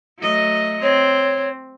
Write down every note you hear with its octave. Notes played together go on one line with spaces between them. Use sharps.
F#3 A3 D#5
C4 C#5